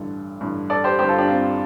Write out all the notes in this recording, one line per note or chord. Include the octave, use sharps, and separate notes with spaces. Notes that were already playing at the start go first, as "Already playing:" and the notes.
Already playing: A1 G2 D3 A4
A1 G2 D3
A4 D5
G4 C5
G1 G2 D3 G4 C5
F4 A4
D4 G4
C4 F4